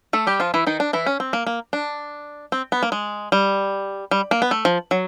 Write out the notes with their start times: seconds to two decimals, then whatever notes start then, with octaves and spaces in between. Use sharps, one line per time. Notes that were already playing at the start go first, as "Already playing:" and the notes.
0.13 A3 A4
0.27 G3 G4
0.40 F3 F4
0.54 E3 E4
0.67 D#3 D#4
0.80 D4
0.93 E3 E4
1.06 C#4
1.20 C4
1.33 A#3
1.46 A#3
1.73 D4
2.52 C4
2.72 B3
2.83 A#3
2.92 G#3
3.32 G3
4.11 G3
4.31 A#3
4.42 B3
4.51 A3
4.65 F3
4.91 F#3